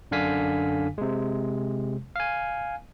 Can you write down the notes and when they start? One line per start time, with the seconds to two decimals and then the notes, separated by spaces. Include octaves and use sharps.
0.11 F#2 D3 D4 F5 G#5 B6
0.98 C3 G#3
2.16 F5 G#5